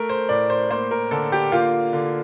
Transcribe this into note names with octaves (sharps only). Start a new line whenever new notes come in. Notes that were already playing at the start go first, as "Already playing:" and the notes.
Already playing: A3 A#4
C5
A2 D5
C5
A#3 C5
A#4
D3 A4
G4
A#3 F4
D3